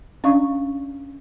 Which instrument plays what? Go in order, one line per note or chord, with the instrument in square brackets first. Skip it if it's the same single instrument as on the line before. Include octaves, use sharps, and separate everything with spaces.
[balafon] C#4 D4 D5 F5 C#6